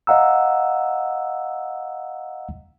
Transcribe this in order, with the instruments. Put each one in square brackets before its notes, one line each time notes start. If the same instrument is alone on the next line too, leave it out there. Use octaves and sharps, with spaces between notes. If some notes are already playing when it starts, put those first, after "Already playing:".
[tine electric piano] D#5 F5 F#5 A#5 E6